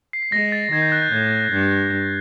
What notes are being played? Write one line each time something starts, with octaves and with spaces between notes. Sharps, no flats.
C7
B6
G#3 A#6
A6
D#3 G#6
G6
F#6
G6
A2 G#6
G2